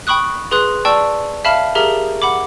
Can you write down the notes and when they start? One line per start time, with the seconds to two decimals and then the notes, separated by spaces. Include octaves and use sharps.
0.07 G5 B5 C#6 D#6 F#6
0.51 G#4 B4 C6 D#6 F#6
0.85 D5 G5 A5 C#6 E6
1.45 E5 F5 A5 B5 F6
1.75 G4 G#4 A#4 E5 A#5 F6
2.22 F#5 B5 D6